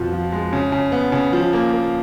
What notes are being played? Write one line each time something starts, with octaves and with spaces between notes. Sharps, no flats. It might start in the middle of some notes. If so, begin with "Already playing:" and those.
Already playing: F2 B2 F3
F3
G#3
C#3
C#3
B3
C#3
F3
A#3
A#3